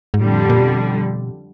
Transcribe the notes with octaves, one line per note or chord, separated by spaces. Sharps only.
G#2
F2 A2 D3 G3
A#2
B2